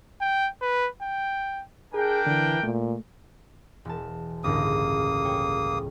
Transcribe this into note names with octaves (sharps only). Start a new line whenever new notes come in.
G5
B4
G5
D4 G#4 A#4 G5
D3 E3
A#2 A3
E1 A5
G1 C#2 A2 A#3 D#6
C#5 G5